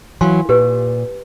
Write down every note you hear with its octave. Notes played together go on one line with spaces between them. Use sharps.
E3 F#3 F5 G#5 C6
A#2 G4 B4